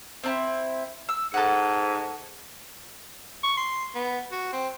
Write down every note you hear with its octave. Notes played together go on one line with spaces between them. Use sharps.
C4 D4 E4
E6
G#2 A4 F#5
C#6
C6
B3
F#4
C4